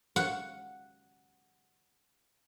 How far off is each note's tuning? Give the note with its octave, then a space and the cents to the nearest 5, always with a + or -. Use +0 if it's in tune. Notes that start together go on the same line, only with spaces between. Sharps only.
F#5 +0